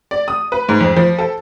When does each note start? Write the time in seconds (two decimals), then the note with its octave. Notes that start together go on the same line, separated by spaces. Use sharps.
0.11 D5
0.28 D#6
0.52 B4
0.69 G#2
0.80 F2
0.96 F3
1.19 A4